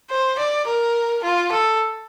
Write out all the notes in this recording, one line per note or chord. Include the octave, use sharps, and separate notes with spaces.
C5
D5
A#4
F4
A4